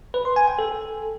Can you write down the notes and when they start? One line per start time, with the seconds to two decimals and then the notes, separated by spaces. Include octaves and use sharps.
0.14 B4
0.25 C6
0.36 G#5
0.47 G5
0.59 A4